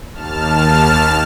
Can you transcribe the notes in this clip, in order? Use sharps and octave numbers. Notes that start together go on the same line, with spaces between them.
D#2 A5 F6